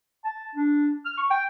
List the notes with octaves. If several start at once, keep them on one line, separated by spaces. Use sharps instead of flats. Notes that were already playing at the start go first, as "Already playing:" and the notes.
A5
D4
F6
C#6
G5